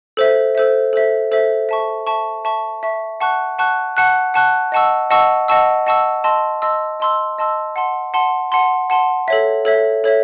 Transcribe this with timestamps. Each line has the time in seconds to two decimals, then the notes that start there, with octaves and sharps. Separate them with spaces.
0.17 A4 C5 E5
0.55 A4 C5 E5
0.93 A4 C5 E5
1.32 A4 C5 E5
1.69 E5 A5 C#6
2.07 E5 A5 C#6
2.45 E5 A5 C#6
2.83 E5 A5 C#6
3.20 F#5 A5 C#6 F#6
3.59 F#5 A5 C#6 F#6
3.97 F#5 A5 C#6 F#6
4.34 F#5 A5 C#6 F#6
4.72 D#5 F#5 A5 C#6 E6
5.10 D#5 F#5 A5 C#6 E6
5.48 D#5 F#5 A5 C#6 E6
5.86 D#5 F#5 A5 C#6 E6
6.24 D#5 A5 C6 E6
6.62 D#5 A5 C6 E6
7.00 D#5 A5 C6 E6
7.38 D#5 A5 C6 E6
7.76 F#5 A5 C6
8.14 F#5 A5 C6
8.52 F#5 A5 C6
8.90 F#5 A5 C6
9.28 A4 C#5 E5
9.65 A4 C#5 E5
10.04 A4 C#5 E5